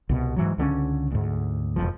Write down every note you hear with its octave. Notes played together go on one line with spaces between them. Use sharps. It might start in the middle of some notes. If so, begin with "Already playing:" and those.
C2 B2
G#2 E3 F#3
C#2 D3 G#3 C#4
D2 G#2
E1 A#1 F2 F3